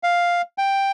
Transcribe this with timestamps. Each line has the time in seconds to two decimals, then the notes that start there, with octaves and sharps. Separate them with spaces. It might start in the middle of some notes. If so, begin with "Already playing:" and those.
0.03 F5
0.58 G5